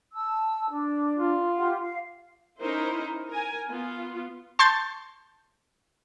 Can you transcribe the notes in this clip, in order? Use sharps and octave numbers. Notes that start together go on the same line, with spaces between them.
A5 E6
D4
F4
G4 F#5
F5
C#4 D#4 E4 A#4 C5
A#4 G#5
B3 F4
A5 C6 C#6 G6 A6